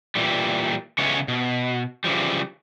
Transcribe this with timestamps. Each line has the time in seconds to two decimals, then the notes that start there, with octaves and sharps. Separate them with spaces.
0.15 A#2 E3 G3
0.98 C#3 E3 G#3 B3 C#5
1.28 B2
2.04 C#3 E3 F3 G3